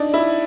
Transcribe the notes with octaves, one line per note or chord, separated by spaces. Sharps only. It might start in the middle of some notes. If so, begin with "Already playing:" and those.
Already playing: D4 D#4
E4